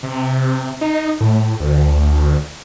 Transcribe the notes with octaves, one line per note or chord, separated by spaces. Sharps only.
C3
D#4
A2
D2